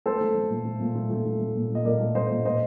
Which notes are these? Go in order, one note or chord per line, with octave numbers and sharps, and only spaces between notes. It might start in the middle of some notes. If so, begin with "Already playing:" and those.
A3 A4 C5
A3
A3
A#2
A3
A#2
A3
A3
A3
A3
A#2
A#2 D#5
A#2 A#4 D5
A3
A3 C5 D#5
A#2
A#2 C5 D#5